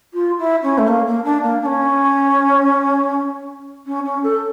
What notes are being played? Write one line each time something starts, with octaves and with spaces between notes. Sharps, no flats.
F4
E4
C#4
A3
A#3
A#3
D4
A#3
D4
C#4
C#4
C#4
A4